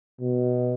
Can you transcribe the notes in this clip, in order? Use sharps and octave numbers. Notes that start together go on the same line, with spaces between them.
B2